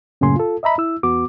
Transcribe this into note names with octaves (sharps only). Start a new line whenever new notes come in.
F#2 A2 C#3 A#3 G#5 C6
F4 A4
D#5 E5 A#5 B5
E4 E6
E2 B3 F#4 D6